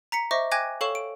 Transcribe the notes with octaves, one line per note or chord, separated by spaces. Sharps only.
A#5 B6 C#7
C5 D#5 E5 C#6 D6 A#6
G5 G#5 D6 F#6 G#6 A#6
A4 C#5 F5 C#6 E7 F#7
D7